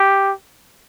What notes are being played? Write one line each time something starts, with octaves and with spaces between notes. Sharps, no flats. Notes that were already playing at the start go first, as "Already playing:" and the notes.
Already playing: G4